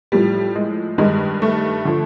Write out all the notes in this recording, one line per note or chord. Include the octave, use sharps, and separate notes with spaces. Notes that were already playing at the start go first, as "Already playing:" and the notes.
A2 F3 G3
G#3
G2 D#3 G3 G#3
A3
D3 F3